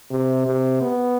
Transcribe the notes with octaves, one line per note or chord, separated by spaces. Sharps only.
C3
C3
B3